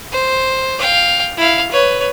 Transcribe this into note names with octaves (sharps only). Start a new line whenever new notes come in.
C5
F5 G5
E4 F5
B4 C#5